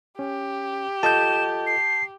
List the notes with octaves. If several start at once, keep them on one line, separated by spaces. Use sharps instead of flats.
C#4 G4
F4 A4 D#5 A5 G6 E7
C7